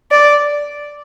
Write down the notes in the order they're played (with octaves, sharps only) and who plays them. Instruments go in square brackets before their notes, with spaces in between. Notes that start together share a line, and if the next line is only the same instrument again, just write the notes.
[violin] D5